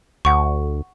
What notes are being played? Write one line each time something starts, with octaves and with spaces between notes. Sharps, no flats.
D2 F#5 C#6